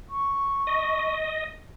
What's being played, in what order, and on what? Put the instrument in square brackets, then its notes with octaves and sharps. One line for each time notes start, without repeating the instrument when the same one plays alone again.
[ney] C#6
[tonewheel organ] D#5